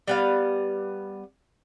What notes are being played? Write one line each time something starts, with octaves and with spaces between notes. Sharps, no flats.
G3 B3 F5